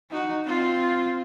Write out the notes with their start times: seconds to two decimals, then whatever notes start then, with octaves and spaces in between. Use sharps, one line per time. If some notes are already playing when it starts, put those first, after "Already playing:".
0.11 D#4 F#4
0.47 C4 F4